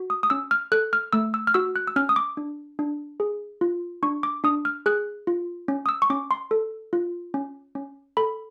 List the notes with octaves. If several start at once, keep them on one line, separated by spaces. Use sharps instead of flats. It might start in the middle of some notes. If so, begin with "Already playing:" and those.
Already playing: F#4
D#6
D#6
C#4 E6
F6
A4 F#6
F6
A3 E6
E6
F6
F#4 E6
F#6
E6
C#4 F6
D#6
D6
D4
D4
G#4
F4
D4 C#6
D6
D4 D#6
F6
G#4 F#6
F4
C#4
D#6
E6
C#6
C#4 D6
C6
A4
F4
C#4
C#4
A4 B5